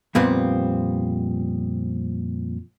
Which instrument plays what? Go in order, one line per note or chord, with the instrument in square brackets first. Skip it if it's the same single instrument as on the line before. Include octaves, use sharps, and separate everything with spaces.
[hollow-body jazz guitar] F2 A#2 G3 B3 C4